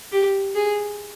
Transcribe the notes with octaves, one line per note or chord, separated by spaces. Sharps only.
G4
G#4